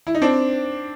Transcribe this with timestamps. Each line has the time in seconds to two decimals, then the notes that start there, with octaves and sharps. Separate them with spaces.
0.07 E4
0.15 D#4
0.22 C4 D4